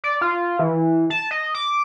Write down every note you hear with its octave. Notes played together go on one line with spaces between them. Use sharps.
D5
F4
E3
A5
D#5
D6